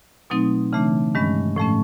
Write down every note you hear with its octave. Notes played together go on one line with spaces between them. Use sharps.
B2 F#3 A3 C4 D#4
C#3 E3 A3 D4
G2 D#3 G#3 C#4
A2 F3 A3 C#4